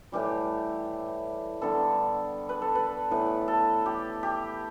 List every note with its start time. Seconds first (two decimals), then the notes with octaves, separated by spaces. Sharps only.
0.12 A2 E3 G3 G4
1.61 D3 G3 B3 A4
2.49 B4
2.62 A4
2.75 B4
3.11 A2 E3 B3 B4
3.48 A4
3.86 G4
4.23 G4